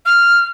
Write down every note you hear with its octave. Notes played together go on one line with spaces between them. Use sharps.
F6